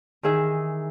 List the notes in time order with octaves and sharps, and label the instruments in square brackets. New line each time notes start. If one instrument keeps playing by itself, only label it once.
[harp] D#3 E3 G#4 E5